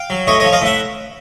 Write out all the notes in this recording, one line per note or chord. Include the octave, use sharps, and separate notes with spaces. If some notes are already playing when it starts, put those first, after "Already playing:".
Already playing: F5 G5
F#3
A2 C#5 D#5
F3 C#5 D#5
D#5 F5
A2 E5 F#5